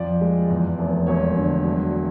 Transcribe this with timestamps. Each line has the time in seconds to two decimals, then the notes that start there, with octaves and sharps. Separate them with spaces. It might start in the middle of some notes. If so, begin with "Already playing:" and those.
Already playing: F2 F3 D5
0.21 G#3
0.50 E2
0.79 F1
1.07 E1 C#5
1.36 D3
1.64 F#3